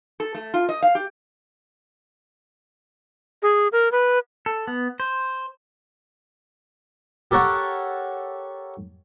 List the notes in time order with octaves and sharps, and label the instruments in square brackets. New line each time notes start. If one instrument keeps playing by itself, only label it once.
[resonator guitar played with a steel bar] A4
A3
F4
D#5
F5
G4
[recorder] G#4
A#4
B4
[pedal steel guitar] A4
B3
C5
[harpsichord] G4 A4 A#4 C#5 F#5